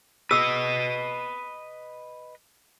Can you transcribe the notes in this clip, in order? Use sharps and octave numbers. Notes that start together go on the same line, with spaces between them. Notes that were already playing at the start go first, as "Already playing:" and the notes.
G#4 B4 D#5 E6